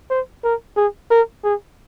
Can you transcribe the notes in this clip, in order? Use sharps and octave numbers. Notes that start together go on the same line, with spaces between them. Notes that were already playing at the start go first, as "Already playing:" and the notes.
C5
A#4
G#4
A#4
G#4